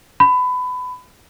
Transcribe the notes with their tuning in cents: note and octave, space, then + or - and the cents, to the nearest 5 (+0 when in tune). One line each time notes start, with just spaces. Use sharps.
B5 +25